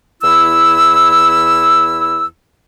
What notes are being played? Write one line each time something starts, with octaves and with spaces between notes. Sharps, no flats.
E2 E4 E6